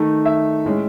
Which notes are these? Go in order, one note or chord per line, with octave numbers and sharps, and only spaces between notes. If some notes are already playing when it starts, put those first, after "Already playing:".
Already playing: D#3 A3 D#4
E5
A2 G#3 C#4